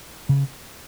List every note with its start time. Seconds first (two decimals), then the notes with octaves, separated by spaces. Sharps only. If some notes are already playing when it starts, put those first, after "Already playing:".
0.29 C#3